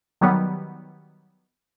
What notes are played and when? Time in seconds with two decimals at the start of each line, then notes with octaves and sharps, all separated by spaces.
0.21 D#3 F#3 G3 B3